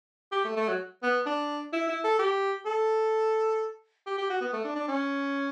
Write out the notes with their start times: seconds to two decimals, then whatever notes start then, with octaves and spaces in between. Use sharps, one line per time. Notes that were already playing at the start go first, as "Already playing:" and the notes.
0.32 G4
0.45 A3
0.57 A3
0.68 F#3
1.03 B3
1.26 D4
1.73 E4
1.88 E4
2.04 A4
2.19 G4
2.66 A4
4.06 G4
4.18 G4
4.30 F#4
4.41 B3
4.53 A3
4.65 D4
4.75 D4
4.88 C#4